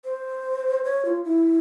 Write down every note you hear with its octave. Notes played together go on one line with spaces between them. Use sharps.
C5
C#5
F4
E4